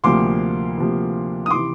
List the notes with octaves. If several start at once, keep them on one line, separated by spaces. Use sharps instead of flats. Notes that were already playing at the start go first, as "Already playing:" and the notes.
D2 C3 F3 A#3 C6 D6
D2 C3 F3 A#3
D#6
C3 E3 C6 D6